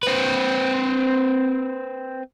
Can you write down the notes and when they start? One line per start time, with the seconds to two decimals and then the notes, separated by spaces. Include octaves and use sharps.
0.03 C4 B4